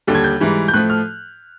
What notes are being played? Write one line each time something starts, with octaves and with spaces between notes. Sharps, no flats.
D#2 D3 G3
G#6
G6
G#2 E3 G3
G6
A2 F3 A3 F#6
F6